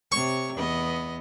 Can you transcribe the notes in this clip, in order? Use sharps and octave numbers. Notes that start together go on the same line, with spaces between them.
C3 C#5 C#6
E2 B3 D#5